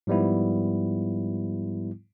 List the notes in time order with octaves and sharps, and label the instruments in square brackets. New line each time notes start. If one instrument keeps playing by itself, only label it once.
[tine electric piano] G#2 F3 G3 B3 E4